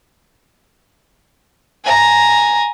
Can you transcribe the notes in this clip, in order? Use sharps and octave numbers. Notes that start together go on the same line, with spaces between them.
G#5 A#5